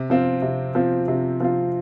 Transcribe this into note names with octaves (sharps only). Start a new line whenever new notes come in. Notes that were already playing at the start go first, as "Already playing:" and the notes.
Already playing: C3
F3 C4 F4
C3
F3 C4 F4
C3
F3 C4 F4